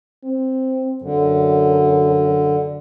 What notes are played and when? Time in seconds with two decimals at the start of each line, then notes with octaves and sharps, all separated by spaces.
0.24 C4
1.03 F#2 D3